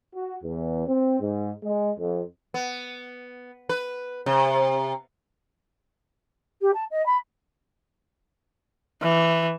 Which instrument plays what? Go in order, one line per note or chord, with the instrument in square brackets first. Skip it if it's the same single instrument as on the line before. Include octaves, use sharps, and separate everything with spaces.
[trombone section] F#4
E2
C4
G#2
G#3
F2
[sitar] B3
B4
C3
[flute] G4
A5
D#5
B5
[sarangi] E3